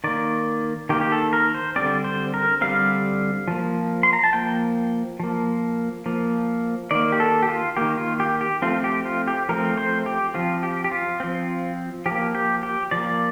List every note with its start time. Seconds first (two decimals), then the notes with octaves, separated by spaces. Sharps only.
0.04 D#3 A#3 D5
0.89 D#3 A#3 G4
1.01 G4
1.12 A4
1.33 A#4
1.54 C5
1.76 D3 G3 C4 D5
2.04 C5
2.34 A#4
2.61 D3 G3 C4 F5
3.48 F3 A#3
4.03 C6
4.13 A#5
4.24 A5
4.33 F3 A#3 G5
5.20 F3 A#3
6.06 F3 A#3
6.91 D#3 A#3 D5
7.12 G4
7.20 A4
7.42 G4
7.49 F4
7.77 D#3 A#3 G4
7.98 F4
8.20 G4
8.41 G4
8.62 F3 A3 C4 F4
8.84 G4
9.06 F4
9.28 G4
9.49 F3 A3 C4 A#4
9.77 C5
10.06 G4
10.34 F3 C4 F4
10.63 G4
10.84 G4
10.91 F4
11.20 F3 C4
12.06 F3 G4
12.11 A#3
12.35 G4
12.63 G4
12.91 F3 A#3 D5